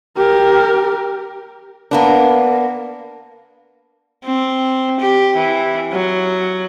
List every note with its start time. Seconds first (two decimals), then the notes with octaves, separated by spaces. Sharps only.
0.17 G4 A#4
1.91 A#3 B3 D4
4.24 C4
5.00 G4
5.36 E3
5.93 F#3